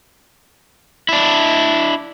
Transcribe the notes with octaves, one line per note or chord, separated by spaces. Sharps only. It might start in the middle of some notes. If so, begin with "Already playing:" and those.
D4 E4